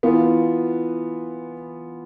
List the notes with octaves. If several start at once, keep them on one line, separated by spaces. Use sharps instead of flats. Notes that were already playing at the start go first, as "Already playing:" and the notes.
E3 B3 F4